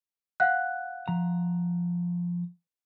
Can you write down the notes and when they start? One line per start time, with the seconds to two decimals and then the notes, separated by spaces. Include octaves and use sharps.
0.40 F5 F#5 F#6
1.08 F3 A#5